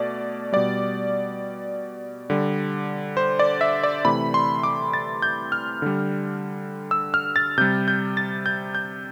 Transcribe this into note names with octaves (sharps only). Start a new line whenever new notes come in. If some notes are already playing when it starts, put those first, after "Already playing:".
Already playing: B2 A3 D5
B2 G3 D5
D3 G3
C5
D5
E5
D5
C3 E3 A3 B5
C6
D6
A6
G6
F6
D3 G3
E6
F6
A6
C3 G3 G6
G6
A6
G6
G6